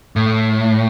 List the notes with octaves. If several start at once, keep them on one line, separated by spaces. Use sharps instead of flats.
A2